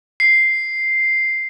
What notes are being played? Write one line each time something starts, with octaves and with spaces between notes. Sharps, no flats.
C7